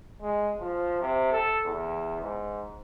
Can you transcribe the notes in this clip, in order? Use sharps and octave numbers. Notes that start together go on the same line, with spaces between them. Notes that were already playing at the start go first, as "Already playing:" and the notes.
G#3
F3
C3
A4
E2
G#2